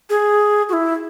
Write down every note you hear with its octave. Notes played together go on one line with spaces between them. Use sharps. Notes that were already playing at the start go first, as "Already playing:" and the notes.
G#4
F#4
E4